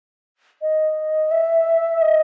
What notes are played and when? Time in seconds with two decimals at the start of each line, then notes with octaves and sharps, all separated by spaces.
0.62 D#5
1.31 E5
2.01 D#5